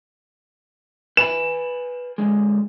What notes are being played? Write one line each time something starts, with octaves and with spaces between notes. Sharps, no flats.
B4 G#5 B5 E7
D3 G#3